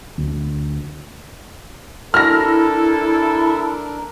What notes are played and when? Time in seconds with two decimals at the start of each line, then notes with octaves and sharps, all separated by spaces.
0.18 D2
2.14 D4 E4 A4 A#4 F6 A#6